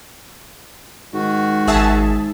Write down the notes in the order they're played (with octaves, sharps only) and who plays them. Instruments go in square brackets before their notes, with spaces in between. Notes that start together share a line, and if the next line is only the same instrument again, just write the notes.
[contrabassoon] G#2 [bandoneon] D#3 F#4
[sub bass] G#1 [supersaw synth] G#4 E5 A5